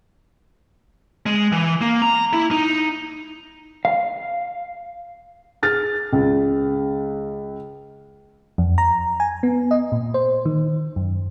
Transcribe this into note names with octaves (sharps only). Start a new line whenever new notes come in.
G#3
E3
A#3
A#5
E4
D#4
F5
G#4 F6 A6
C#2
F2
A#5
G#5
B3
D#5
A#2
C5
D#3
F#2